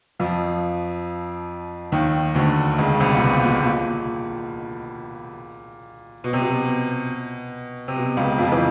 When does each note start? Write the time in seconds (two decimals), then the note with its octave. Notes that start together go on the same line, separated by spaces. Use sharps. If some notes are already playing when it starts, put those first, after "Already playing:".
0.19 F2 F3
1.92 D#2 D#3
2.34 D2 D3
2.78 C#2 C#3
3.00 C2 C3
3.16 A#2
3.21 B2
3.43 A#2
3.65 A#2
3.86 A#2
6.24 B2
6.33 C3
6.42 B2
7.88 C3
7.96 B2
8.17 C#2 C#3
8.39 F2 F3
8.52 E3